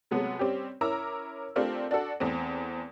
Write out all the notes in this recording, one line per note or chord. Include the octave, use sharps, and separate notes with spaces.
C3 F#3 G#3 A3 B3
G3 C4 C#4 G4
C#4 E4 A#4 A#5 D6 E6
A3 C4 D4 F4 G4 A#4
D4 F#4 A4
E2 A3 C4